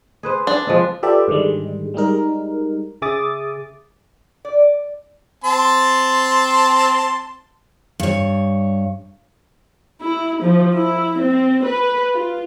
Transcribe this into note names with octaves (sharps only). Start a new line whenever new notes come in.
G#4 B4 C5
D4
F3 G#3 C4
F4 G4 A4 B4 D5 E5
G#2 D3 D#3 G3 G#3
G3 G#3 D#4 A#4
C#3 G#4 E5 D6 D#6 A6
D5
C4 A5 C6
G2 C#5
E4
F3
E4
C4
B4
F4